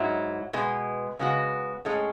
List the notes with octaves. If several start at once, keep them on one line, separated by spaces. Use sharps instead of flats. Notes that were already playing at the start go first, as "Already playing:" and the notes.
Already playing: G#2 F#3 E4
B2 G#3 B3
C#3 G#3 B3 F#4
A2 G#3 C#4